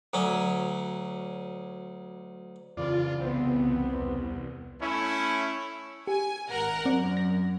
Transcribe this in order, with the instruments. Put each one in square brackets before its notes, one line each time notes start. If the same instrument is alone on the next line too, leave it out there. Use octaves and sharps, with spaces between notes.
[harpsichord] D2 F#3 C#4
[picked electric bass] F2 C#3 E3 [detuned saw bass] F4 [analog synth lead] D5
[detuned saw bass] C2 [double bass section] B3 [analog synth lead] C4
[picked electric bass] E2
[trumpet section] A3 C#4 E4
[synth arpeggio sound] G4 [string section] G#5
[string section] G#1 A#4 F#5
[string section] F#2 [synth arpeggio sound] C4 D5
[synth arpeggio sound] A#6